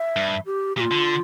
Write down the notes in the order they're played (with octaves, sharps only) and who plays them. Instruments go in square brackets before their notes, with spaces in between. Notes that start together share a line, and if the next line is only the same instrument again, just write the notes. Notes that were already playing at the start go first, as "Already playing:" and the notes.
Already playing: [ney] E5
[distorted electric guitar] G2
[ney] G4
[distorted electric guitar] A#2 [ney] G4
[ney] F4
[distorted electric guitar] D3